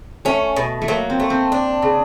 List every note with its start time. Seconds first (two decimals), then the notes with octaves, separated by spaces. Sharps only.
0.25 A3 C#4
0.56 B2
0.82 A3
0.88 F#3 A#3
1.10 C4
1.20 A3
1.30 C4
1.52 D4
1.82 C#3